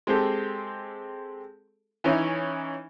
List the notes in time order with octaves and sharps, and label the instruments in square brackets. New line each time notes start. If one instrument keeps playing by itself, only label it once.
[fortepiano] G#3 C4 G4 A4
E3 C#4 D#4 E4